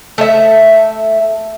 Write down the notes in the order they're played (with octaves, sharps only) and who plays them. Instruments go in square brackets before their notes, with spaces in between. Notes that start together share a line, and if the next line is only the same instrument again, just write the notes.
[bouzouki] A3 E5